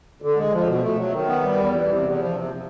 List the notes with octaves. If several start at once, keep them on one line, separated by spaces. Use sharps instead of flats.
D3
G#3
F3
B2
A3
F#3
D#3
B3
G3
E2
E3
C3
E2
F3
C3